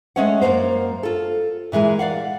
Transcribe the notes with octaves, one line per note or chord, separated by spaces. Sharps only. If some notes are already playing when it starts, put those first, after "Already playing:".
G#3 A3 C#4 C#5 F#5
F#2 A#2 A#3 C5
F4 A4
A#2 E3 G#3 A#4
D5 F5 F#5